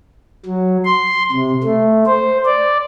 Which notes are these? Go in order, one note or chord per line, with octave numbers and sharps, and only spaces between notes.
F#3
C6
C3
A3
C5
D5